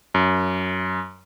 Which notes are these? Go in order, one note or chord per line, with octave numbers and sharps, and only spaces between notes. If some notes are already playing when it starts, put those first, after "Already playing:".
F#2